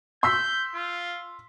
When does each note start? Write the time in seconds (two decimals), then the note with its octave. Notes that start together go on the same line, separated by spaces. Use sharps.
0.23 C6 E6 G6 B6
0.75 F4